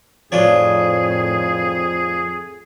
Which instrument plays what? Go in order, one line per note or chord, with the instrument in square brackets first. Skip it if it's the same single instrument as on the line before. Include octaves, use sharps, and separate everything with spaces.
[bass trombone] F2 [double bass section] A2 D#3 [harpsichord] F3 D4 C#5 [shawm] G#4